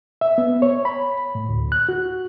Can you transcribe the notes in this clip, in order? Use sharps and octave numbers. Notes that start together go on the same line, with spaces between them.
E5
B3
C#5
B5
A2
D2
F#6
F#4